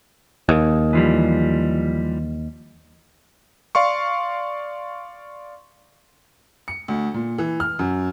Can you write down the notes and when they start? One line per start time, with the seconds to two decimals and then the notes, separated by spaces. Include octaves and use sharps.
0.49 D#2
0.93 E3 F3 G3
3.75 D5 F5 C6 C#6
6.68 C#7
6.88 D2
7.14 A#2
7.38 E3
7.60 F6
7.79 F#2